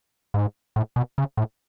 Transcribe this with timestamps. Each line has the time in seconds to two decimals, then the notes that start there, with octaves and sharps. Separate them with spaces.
0.34 G#2
0.76 A2
0.96 B2
1.18 C#3
1.37 A2